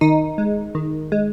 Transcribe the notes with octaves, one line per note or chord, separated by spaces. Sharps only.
D#3 D#4
G#3
D#3
G#3